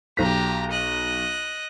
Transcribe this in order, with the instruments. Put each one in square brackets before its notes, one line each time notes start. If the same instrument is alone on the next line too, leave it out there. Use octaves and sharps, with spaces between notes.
[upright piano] B1 B6 [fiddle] G4 A#5
[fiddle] D#5 F#6